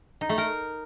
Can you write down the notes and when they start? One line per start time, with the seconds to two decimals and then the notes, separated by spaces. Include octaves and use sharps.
0.21 D#4
0.29 A3
0.38 A#4